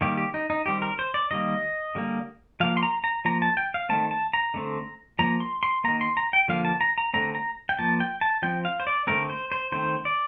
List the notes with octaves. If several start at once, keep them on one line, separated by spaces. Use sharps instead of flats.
D#3 G3 A#3 G4
G4
D#4
D#4
D#3 G3 C4 G4
A#4
C5
D5
D#3 G3 A#3 D#5
D3 G3 A#3
F3 A#3 F5
C6
A#5
A#5
F3 A#3 A#5
A5
G5
F5
D#3 A3 C4 A5
A5
A#5
D3 A3 C4
F3 A#3 A#5
C6
C6
D#3 A#3 A#5
C6
A#5
G5
D3 F3 A#3 F5
A5
A#5
A#5
D3 A3 C4 A#5
A#5
G5
F3 A#3 A5
G5
A5
F3 C4 G5
F5
C5
D5
D3 A3 C4 A#4
C5
C5
D#3 A3 C4 C5
D5